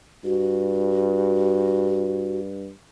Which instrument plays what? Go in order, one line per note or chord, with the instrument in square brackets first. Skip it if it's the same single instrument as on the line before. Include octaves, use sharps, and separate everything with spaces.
[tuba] G2 [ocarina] F#4